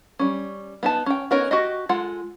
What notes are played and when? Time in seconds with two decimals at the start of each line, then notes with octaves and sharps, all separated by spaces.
0.19 G3 C#4
0.83 B3 D#4 A5
1.06 C#4 G5
1.31 B3 C#4 D#4 A#4 C#5
1.51 F#4 G4 D#5
1.89 G#3 F4 A4 F#5